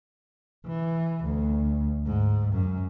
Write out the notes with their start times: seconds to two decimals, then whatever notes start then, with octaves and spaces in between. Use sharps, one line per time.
0.66 E3
1.24 D2
2.06 G#2
2.53 F#2